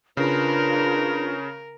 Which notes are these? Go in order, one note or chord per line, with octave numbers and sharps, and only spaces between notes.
C#3 D4 F4 A#4 B4